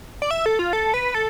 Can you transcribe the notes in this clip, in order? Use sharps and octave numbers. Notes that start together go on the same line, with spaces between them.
D5
E5
A4
F4
A4
B4
A4